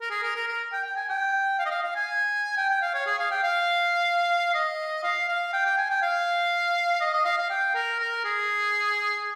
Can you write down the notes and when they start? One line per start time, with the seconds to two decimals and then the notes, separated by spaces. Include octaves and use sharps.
0.02 A#4
0.11 G#4
0.23 A#4
0.36 A#4
0.48 A#4
0.73 G5
0.85 G5
0.97 G#5
1.09 G5
1.59 F5
1.66 D#5
1.71 F5
1.84 F5
1.96 G#5
2.57 G5
2.69 G5
2.82 F5
2.94 C#5
3.06 G#4
3.19 F5
3.31 G5
3.44 F5
4.55 D#5
5.04 F5
5.28 F5
5.53 G5
5.66 G5
5.78 G#5
5.90 G5
6.02 F5
7.01 D#5
7.14 D#5
7.25 F5
7.38 F5
7.50 G5
7.75 A#4
8.00 A#4
8.25 G#4